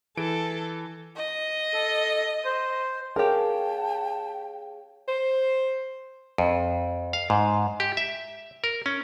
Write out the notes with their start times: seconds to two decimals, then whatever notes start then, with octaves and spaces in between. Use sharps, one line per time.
0.17 E3 A4 D7
1.16 D#5
1.73 A4
2.45 C5
3.16 G4 G#4 A#4 C#5 F5 G5 A5
5.08 C5
6.38 F2
7.13 F5
7.30 G#2
7.80 G4
7.97 E5
8.64 A#4
8.86 C#4